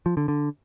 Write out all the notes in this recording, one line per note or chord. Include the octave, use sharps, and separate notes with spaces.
F3
D3
D3